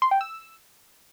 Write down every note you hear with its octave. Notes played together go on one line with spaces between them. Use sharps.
C6
G5
E6